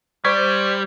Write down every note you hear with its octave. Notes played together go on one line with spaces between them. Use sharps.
G3 C5 D5 C#6 G#6 B6